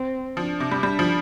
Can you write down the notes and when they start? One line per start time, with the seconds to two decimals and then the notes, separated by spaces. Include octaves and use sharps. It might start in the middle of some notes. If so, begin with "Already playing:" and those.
Already playing: C4
0.37 F3 D4
0.60 C3
0.71 G3
0.83 G3 D4
0.99 F3